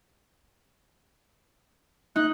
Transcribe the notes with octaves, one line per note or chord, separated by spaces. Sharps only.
D#4 F#6